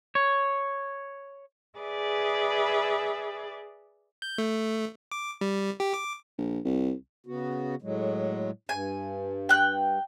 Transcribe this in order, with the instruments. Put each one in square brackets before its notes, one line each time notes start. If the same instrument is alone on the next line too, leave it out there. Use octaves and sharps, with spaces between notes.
[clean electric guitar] C#5
[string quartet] G#4 B4 D5 E5
[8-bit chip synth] G6
A3
D6
G3
G4
D6
[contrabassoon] A#1
C2
[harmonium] C#3 B3 F#4
A2 F#3 G#3
[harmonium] G2 [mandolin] G#5
[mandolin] G5 F#6